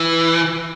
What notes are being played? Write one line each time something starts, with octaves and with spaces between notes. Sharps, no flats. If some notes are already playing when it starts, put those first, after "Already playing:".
Already playing: E3